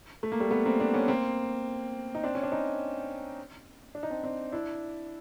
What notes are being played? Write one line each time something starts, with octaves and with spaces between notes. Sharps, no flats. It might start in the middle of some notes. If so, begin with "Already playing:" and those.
A3
A#3
G3 A3
A3 B3
A#3 C4
C4 D4
B3 C#4
A#3 C4
D#4
C4 D4
C#4
D4
C#4 D#4
D4
D#4
C4 D4
C4 D4
D4 E4